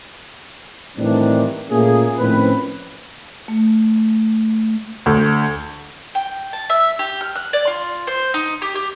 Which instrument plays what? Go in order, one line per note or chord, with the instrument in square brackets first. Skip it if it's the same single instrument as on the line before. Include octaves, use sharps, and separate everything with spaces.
[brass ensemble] A2 D#3 E3 G3 C4 D4
A#2 A3 A#3 C#4 G#4
A2 D#3 F3 C4 C#4 B4
[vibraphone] A3
[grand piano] D2
[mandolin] G5
A5
E5
G4
F6
F#6
D5
F4
C5
D#4
G4
G4